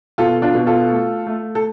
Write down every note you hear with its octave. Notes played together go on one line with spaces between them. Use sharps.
B2 F4 A4
D4 F4
B2
F4 A4
A3
A3
A4